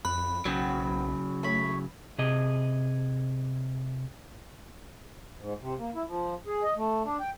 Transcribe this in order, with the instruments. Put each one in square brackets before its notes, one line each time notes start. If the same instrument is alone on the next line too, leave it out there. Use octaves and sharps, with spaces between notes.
[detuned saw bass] F2 [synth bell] B5 [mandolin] F#6
[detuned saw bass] B1 [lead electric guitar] C#3 F#3 [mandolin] B3 C4
[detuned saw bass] A3 [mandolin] C#5 B5
[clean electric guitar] C3 G#4 D#5
[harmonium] G#2
C3
A#3
E4
F3
G#4
D#5
A3
D4
G5